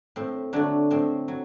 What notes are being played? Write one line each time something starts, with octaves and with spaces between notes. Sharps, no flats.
A2 C4
D3 F#3 A3 D4
A2 C4
F#3